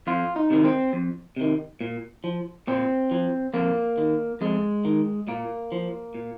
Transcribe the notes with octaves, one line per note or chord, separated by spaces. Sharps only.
F2 F4
D#4
C3 D#3
C4
F2
C3 D#3
A#2
F3
A#2 C4
F3
F2 A#3
D#3
F2 G#3
D#3
A#2 A#3
F3
A#2